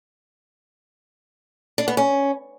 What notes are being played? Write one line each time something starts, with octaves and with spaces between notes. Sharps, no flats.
D4
B3
C#4